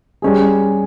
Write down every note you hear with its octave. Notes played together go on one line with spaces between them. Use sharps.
G3 C#4 G#4